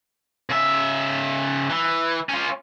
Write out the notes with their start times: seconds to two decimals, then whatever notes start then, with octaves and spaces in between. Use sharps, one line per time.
0.50 C#3 E5
1.70 E3
2.29 C#4 F4